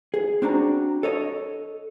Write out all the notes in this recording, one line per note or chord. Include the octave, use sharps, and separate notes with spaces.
G#4
C4 D4 F#4 A#5
A4 C#5 D#5